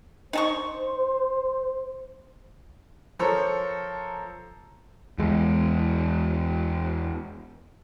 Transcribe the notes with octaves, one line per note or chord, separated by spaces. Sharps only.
D#4 C5 A5 C#6
F3 A4 A#4 C5 C#5
E2 G#3